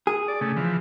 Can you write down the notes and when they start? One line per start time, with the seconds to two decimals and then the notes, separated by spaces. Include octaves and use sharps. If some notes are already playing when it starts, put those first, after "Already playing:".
0.07 G#4
0.28 D5
0.41 C#3 A3
0.57 E3 F3